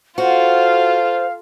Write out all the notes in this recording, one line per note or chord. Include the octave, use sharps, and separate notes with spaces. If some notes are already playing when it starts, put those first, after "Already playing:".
F4 F#4 A4 C5 F5